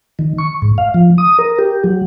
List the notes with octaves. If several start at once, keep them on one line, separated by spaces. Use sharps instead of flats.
D#3
C#6
G#2
F5
F3
D#6
A#4
G4
F#3